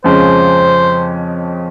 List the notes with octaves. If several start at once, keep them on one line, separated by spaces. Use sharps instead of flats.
F2 C#3 F3 G#3 C#4 C5